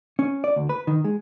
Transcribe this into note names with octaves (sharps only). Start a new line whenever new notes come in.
C#4
D5
D2
B4
D#3
G#3